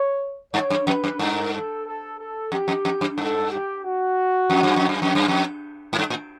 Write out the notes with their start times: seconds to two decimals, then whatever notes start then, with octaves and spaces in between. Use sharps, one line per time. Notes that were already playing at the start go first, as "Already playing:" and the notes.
Already playing: C#5
0.54 G2 C#5
0.70 F#2
0.87 F2 B4
1.04 F#2
1.19 G2 A#4
1.53 A4
1.86 A4
2.19 A4
2.52 F2 G4
2.68 F2
2.85 F2
3.01 F#2
3.18 G2 A4
3.51 G4
3.84 F#4
4.50 F2
4.63 F#2
4.76 F2
4.89 F#2
5.02 F2
5.15 F#2
5.28 F2
5.93 G#2
5.99 G2
6.10 A2